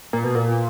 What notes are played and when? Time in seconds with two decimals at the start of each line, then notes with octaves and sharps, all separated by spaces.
0.13 A#2
0.24 B2
0.35 A#2